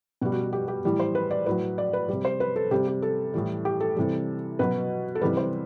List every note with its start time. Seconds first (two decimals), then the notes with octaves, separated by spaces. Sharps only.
0.21 B2 F#4
0.25 G3
0.32 F#4
0.43 F#4
0.53 G4
0.68 G4
0.85 A2 E3 G3
1.00 C5
1.15 B4
1.31 D5
1.46 A2 F#3 B4
1.78 D5
1.93 B4
2.09 C3 G3
2.25 C5
2.40 B4
2.56 A4
2.71 C3 G3 G4
2.88 G4
3.02 A4
3.34 A2 E3 G3
3.65 G4
3.80 A4
3.96 C3 E3 G3
4.59 B2 F#3 B4
5.15 A4
5.21 C3 E3 G3 B4
5.37 C5